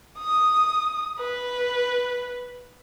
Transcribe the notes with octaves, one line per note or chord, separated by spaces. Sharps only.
D#6
B4